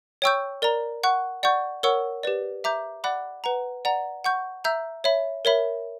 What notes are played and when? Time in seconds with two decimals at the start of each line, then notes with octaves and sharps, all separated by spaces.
0.22 C#5 G5 C#6 E6 G6
0.62 A#4 D5 A#5
1.03 F#5 C#6 F#6
1.43 D5 F#5 C#6 G6
1.83 A#4 C#5 F#5 C#6 E6
2.23 G4 B4 D5
2.64 E5 A#5 D6 G6
3.04 D5 F#5 B5 D6 F#6
3.44 B4 F#5 A#5
3.85 D5 F#5 A#5
4.24 F#5 C#6 G6
4.64 E5 A#5 E6 G6
5.04 C#5 E5 B5
5.45 A#4 C#5 E5 B5